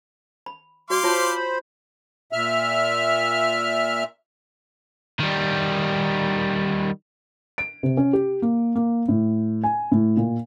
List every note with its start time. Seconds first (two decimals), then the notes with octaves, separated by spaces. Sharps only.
0.46 B5
0.90 G3 F#4 D5 F5 C6 D6
1.04 F4 C5 C#5 A5 B5
2.32 A#2 E5 F6
5.20 D#3 G3
7.58 D7
7.83 C3
7.97 C#4
8.13 G4
8.42 A#3
8.75 A#3
9.08 A2
9.64 G#5
9.92 A2
10.17 A#2